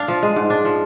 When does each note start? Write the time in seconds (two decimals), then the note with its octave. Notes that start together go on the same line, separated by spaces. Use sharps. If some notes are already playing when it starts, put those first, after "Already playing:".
Already playing: D4 F5
0.08 F3
0.23 G#3
0.36 G#2
0.50 D4
0.65 F3